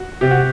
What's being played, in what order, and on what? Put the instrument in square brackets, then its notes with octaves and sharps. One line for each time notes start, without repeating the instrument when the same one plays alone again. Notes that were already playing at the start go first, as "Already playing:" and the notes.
Already playing: [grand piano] F#4
[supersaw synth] C3 [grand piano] G4
[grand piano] F#4